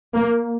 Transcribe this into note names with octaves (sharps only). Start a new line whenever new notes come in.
A#3